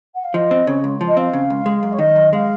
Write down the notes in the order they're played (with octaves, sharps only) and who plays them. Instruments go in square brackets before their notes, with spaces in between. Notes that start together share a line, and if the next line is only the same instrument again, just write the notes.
[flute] F#5
F5
[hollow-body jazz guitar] F3 [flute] D#5
[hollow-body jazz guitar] C4
[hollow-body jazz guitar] C#3 [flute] C#5
[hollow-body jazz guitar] C#2
F3
[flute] D#5
[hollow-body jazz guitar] C4 [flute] F5
[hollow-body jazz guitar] C#3
C#2
G#3
F#2
[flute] C#5
[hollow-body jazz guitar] D#3 [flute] D#5
[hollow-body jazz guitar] F#2
[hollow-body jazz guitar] G#3 [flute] F5